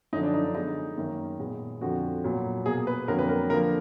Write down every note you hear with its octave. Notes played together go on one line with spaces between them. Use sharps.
F#2 D3 F3 D#4
D4
D#4
D4
D3 G#3 B3 D#4
F#2 D#3 A#3
A#2 G#3 B3
F2 D3 F3 F#4
A#2 F#3 B3
B2 A#3 G#4
B4
F2 D3 F#3 A#3 A#4
B4
A#4
D3 F3 A#3 A#4